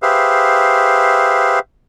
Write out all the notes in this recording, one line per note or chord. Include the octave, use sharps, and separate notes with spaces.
G4 G#4 B4 C5 E5 F5